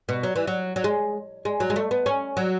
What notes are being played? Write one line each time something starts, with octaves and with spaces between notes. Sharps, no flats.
B2
F#3
E3
F#3
F#3
G#3
G#3
F#3
G#3
A3
B3
C#4
F#3